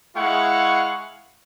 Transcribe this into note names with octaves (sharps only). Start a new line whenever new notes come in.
G#3 E4 F5 F#5 C#6